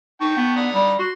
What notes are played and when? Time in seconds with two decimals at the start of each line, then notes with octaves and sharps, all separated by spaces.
0.21 D#4 G5 A5 C#6
0.37 B3
0.56 D3 A#5 D#6
0.74 G3
0.99 F#4 C6